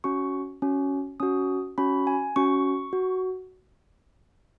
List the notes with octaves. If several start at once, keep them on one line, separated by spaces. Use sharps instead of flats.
C#4 F#4 C#6
C#4 F#4
C#4 F#4 D#6
C#4 F#4 B5
G#5
C#4 F#4 C#6
F#4